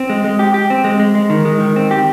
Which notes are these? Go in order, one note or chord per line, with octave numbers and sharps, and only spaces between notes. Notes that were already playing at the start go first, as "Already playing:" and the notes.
Already playing: C4
G#3
G#3
G4
G4
C4
G#3
G#3
G#3
D#3
G#3
D#3
C4
G4